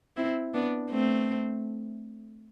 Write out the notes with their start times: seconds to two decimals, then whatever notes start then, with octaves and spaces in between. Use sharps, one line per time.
0.17 C4 E4
0.54 B3 D4
0.90 A3 C4